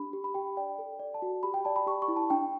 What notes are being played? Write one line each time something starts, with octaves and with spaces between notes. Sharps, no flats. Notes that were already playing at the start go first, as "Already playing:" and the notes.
Already playing: D4 G4 B5
G4
B5
G4 G5
D5 G5
A4
D5
A5
F#4
G4 B5
G5
D5 A5
B5
G4 C#6
C#6
E4
A5
D4 G5